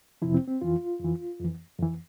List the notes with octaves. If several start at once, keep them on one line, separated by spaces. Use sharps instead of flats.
F2 C3 F3 E4
C4
C4
F2 E3 F4
F2 E3
F2 E3
F2 E3